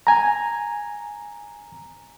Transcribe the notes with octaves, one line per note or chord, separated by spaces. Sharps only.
G#5 A#5